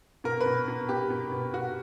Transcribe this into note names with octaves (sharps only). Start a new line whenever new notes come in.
B2 A#4
B4
B2
B2
B2 G4
B2
B2
B2 F#4